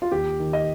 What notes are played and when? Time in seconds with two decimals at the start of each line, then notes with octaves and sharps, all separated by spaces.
0.02 F4
0.12 D#2 G4
0.40 D#3
0.53 D#5